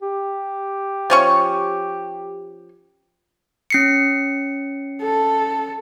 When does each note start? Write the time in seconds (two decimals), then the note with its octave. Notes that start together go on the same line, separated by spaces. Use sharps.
0.02 G4
1.10 F3 C#4 C#6
3.70 C#4 C7 C#7
5.02 A4